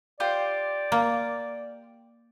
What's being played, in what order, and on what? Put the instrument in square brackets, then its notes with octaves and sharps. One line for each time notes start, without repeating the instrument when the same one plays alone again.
[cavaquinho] F4 G4 C5 [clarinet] D5
[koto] A#3